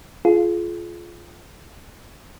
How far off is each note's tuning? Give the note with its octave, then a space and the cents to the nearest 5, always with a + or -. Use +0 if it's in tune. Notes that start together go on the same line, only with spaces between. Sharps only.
F4 -10 G#4 +35